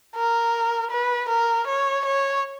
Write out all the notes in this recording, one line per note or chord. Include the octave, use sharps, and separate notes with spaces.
A#4
B4
A#4
C#5
C#5